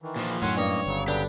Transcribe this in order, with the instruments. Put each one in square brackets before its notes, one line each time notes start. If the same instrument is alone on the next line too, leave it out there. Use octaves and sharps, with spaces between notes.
[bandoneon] D#3 E3
[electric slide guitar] A#2 F3
[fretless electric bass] F#2 A2 [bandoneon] D#3 F#5 C6 [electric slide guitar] F#3 C#4
[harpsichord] G2 [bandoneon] A#3 D#5 [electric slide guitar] C#5
[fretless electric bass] G1 [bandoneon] C#3 F#3
[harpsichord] D3 D4 B4 [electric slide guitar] G4